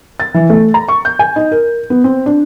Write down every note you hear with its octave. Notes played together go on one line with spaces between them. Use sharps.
A6
E3
A3
A#5
C#6
G6
G#5
D#4
A#4
B3
C4
D4